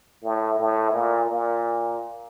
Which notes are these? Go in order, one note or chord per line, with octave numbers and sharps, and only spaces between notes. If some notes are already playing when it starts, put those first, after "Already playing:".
A2
A2
A#2
A#2